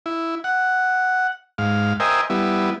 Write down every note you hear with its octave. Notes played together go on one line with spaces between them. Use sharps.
E4
F#5
G#2 F5
A#4 C5 D#5 E5 G5 G#5
G3 B3 E4